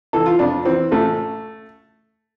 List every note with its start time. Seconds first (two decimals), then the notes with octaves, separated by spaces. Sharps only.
0.13 E3 A4
0.26 F4
0.39 F2 D4
0.65 E3 C4
0.91 A1 A3